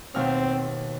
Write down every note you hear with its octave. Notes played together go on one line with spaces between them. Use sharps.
D#2 B2 C4 F6